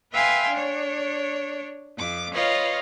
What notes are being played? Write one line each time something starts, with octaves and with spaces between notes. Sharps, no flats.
B4 E5 F5 G5 G#5 C6
D4 C#5
F2 D6
F4 B4 C#5 D#5 F5